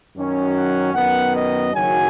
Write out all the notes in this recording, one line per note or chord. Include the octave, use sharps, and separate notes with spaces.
F#2 D#3 F#3 C#4
F#5
F#2 D#3 B3 F#5
D#5
F#1 F#2 D#3 F#3 G#5